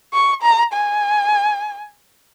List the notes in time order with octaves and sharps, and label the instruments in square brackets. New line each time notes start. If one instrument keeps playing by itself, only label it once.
[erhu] C#6
A#5
G#5